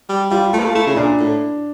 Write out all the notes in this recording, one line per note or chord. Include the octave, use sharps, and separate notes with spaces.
G3
G3 F4
A3 F4
A#3
A3
A3 E4
C#3
A#2 D4
A2